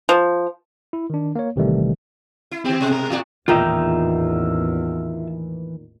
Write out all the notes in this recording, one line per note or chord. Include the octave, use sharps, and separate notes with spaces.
F3
E4
D#3 D4
A#3 C#5
A1 C3 D#3 E3 G3 A3
E4
D#3 C4 G4
G#2 B2 G#3
A#4
E2 F4 F#4 A#4 D5
A1 E2 A#2 D#3 E3 D#4 F4 E5